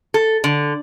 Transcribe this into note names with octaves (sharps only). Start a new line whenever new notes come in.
A4
D3